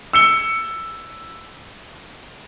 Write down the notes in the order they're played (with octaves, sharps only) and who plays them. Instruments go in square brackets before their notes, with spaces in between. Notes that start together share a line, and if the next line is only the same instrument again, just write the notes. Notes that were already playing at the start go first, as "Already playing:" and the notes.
[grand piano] E6 C#7 G7